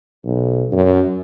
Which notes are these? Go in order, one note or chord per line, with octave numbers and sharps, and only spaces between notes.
B1
F#2